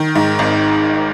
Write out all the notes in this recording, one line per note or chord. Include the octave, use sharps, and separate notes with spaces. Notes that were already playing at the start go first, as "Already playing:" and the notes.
Already playing: D#3
G#2
G#1